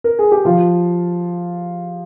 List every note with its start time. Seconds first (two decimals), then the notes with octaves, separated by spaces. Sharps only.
0.04 A#4
0.19 G#4
0.32 G4
0.45 F3 F4